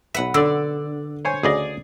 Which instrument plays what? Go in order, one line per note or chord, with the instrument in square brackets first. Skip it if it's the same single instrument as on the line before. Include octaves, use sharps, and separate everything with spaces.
[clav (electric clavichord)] B1 E5 [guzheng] B4 F#5
[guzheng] D3 [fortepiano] D5 E6
[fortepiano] C5 C#5 G#5
[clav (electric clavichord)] D2 C#3 D#5 [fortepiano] G#4 D5